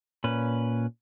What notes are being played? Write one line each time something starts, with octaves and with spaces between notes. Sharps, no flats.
A#2 C#4 B4